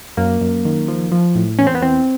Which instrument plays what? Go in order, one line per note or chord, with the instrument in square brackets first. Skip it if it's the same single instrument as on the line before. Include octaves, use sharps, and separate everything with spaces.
[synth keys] F#2 A#3
F#2
D#3
F3
F3
A2
E2 C#4
C4
B3
E3 C4